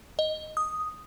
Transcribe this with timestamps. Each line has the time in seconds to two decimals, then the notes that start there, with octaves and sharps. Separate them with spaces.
0.19 D#5
0.57 D#6